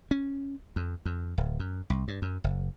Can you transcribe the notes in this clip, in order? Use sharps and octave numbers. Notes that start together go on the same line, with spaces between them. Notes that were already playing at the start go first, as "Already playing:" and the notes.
C#4
F2
F2
D1
F#2
C2
G2
F#2
F#1